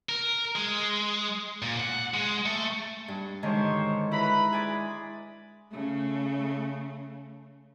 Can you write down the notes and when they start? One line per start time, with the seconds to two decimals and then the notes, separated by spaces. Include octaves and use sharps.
0.09 A#4
0.56 G#3
1.62 A#2
1.80 F#5
2.14 G#3
2.46 A3
3.08 G2
3.43 D3 D#3 G#3 G4 C5 C#5
4.11 E4 B4 A#5 B5
4.53 G#3 G#4 D5
5.71 C#3 A3